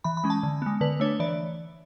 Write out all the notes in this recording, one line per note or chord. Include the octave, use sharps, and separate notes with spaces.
E3 B5
B5
G#3 C#4
A5
D3
G#3 B3
D3 B4
A3 D4 C#5
E3 D5